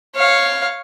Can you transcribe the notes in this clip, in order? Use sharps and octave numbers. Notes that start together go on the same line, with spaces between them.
C#5 F5